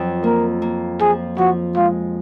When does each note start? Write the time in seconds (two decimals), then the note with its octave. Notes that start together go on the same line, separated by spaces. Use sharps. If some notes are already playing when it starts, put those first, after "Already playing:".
Already playing: F2 F#3
0.24 A#3 A#4
0.62 A#3
1.00 F3 G#4
1.38 F3 F#4
1.76 G#3 F4